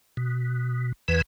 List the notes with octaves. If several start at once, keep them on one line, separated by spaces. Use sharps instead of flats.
B2
E2 E3 B4